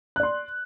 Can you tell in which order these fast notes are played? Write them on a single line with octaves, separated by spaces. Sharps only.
F#6 D5 C6